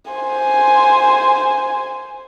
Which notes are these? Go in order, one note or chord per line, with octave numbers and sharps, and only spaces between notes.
C5 G#5